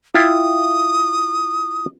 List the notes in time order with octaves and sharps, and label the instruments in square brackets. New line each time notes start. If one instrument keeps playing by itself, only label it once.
[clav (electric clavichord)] E4 F4 G5 [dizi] D#6